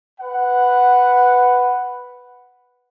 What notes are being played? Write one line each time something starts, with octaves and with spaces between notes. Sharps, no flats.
B4 F#5